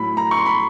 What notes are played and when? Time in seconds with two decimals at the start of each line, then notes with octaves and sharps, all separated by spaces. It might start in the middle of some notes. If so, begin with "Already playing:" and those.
Already playing: A2 F#3 A3 B5
0.17 A#5
0.31 C#6
0.39 C6
0.46 B5